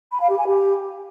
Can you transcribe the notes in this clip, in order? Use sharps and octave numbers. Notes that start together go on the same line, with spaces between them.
B5
F5
G4
G#5
G4